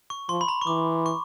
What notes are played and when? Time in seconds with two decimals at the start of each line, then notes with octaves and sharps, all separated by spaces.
0.10 C#6
0.29 F3 C6
0.41 B5
0.48 A#5
0.62 C#6
0.67 E3 D6
1.06 C#6